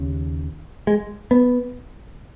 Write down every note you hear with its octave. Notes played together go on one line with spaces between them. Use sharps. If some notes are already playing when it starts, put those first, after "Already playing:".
Already playing: D#2 C#3
G#3
B3